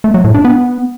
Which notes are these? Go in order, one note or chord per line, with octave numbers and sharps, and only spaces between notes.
A3
F#3
A2
D4
B3